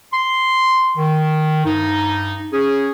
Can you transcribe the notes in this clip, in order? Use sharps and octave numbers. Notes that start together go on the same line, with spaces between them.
C6
D#3
G2 D#4
C#4 G#4